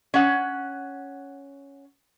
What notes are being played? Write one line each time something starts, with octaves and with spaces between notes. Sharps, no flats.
C#4 F#5